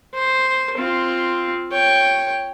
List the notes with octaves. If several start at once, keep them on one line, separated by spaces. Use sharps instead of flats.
C5
C4 F4
C#5 G5